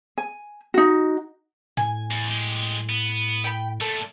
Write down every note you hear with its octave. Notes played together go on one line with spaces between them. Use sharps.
G#5
D#4 F#4
A2 G#5
E2
G#3 G4
B3
G5 B5
A#2 A3 A4 A5